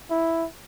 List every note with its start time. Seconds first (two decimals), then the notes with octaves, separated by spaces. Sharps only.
0.10 E4